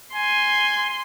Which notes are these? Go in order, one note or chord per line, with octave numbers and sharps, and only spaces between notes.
G#5 C6